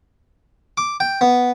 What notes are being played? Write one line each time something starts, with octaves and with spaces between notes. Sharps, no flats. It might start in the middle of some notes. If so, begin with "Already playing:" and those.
D6
G5
B3